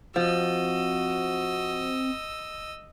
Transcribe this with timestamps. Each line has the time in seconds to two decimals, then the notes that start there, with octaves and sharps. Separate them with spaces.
0.16 F3 C4 F#4 D#5 E6